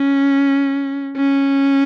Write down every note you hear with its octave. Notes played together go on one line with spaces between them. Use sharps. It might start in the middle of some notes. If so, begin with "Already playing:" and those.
Already playing: C#4
C#4